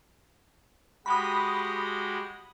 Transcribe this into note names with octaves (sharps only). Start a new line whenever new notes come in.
G#3 F#4 G4 B5 D#6